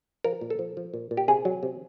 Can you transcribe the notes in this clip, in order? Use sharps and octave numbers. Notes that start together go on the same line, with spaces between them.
F3 A#4
A#2
A4
F3
F3
A#2
A#2
G4
C3 G#4
F#3
C3